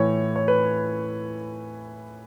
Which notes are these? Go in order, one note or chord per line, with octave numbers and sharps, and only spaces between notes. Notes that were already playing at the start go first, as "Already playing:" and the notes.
Already playing: A2 E3 C#5
C#5
B4